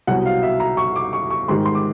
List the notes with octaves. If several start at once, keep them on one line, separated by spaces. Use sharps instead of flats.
C2 B2 F#3 F#5
F5
E5
A#5
C#6
D6
C#6
C#6
G#2 D#3 G3 C6
C6
D6